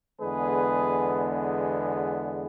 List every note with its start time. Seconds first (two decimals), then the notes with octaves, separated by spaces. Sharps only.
0.20 E2 D3 G#3 B3 G#4 B4